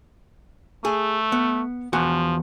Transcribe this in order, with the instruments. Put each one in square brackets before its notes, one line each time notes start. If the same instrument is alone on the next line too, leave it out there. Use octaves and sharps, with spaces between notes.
[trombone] A3 [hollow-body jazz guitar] G#4
[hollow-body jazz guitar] B3
[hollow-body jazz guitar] E2 F#4 G#5 [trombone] F3